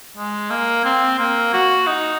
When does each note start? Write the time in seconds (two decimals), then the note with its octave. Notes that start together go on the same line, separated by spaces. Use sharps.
0.17 G#3
0.50 A#3
0.85 C4
1.19 A#3
1.53 F#4
1.87 D#4